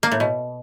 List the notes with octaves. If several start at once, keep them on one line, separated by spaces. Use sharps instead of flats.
A#3
A2
B2